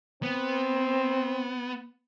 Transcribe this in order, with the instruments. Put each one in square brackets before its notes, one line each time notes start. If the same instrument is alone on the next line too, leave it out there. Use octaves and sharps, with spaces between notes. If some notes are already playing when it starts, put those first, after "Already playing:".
[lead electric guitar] B3 [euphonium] C4